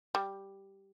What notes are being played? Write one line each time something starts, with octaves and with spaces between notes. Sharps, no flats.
G3